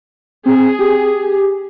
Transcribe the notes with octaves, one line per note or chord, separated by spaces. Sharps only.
C4 G#4
G4